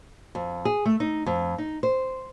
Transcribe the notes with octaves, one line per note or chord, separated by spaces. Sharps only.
F2
G#4
A3
D#4
F2
D#4
C5